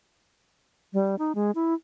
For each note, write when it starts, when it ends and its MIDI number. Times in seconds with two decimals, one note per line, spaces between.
0.93 1.15 55
1.19 1.32 63
1.35 1.51 56
1.55 1.74 64